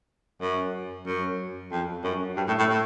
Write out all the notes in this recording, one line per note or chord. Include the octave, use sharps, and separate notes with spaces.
F#2
F#2
F2
F#2
G2
A2
A2
A2